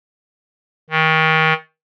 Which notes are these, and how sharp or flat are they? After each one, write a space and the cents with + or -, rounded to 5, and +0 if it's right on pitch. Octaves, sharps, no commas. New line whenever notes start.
D#3 +30